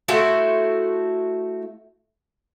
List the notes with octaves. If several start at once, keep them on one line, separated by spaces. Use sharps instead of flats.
A3 E4 F#4 C5